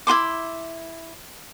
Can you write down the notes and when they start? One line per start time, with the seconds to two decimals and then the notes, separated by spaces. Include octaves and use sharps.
0.07 E4 F4 C6 D6